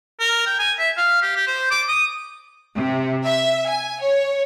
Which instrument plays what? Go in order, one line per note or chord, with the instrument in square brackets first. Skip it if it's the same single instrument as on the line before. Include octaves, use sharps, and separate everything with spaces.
[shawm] A#4
G5
G#5
E5
F5
G4
G4
C5
D6
D#6
[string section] C3
E5
G#5
C#5